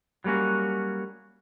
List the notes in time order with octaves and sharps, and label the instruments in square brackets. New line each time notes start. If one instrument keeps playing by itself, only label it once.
[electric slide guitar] F#3 G3 A#3 C#4 F#4